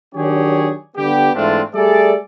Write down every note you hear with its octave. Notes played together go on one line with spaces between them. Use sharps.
D#3 F#3 D4 G4 G#4 C#5
D3 G3 B3 G4
G#2 E3 A3 C4 D4 F4
G3 A3 G#4 A4 D5